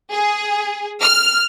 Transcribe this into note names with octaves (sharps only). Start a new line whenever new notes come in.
G#4
F6